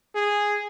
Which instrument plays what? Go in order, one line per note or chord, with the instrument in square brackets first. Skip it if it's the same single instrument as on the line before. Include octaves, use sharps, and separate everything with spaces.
[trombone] G#4